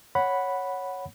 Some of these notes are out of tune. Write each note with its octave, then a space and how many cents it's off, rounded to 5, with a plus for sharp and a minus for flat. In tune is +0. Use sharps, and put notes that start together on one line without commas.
C#5 +0 F#5 +0 B5 +0